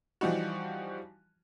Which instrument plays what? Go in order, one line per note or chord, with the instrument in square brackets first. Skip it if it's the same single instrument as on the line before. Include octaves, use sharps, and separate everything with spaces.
[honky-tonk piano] E3 F3 G3 D#4 F#4